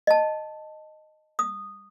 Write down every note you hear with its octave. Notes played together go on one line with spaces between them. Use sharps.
D#5 A5
D#6